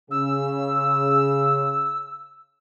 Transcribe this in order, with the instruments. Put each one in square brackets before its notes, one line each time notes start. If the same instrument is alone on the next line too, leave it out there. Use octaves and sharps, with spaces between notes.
[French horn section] C#3 [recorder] E6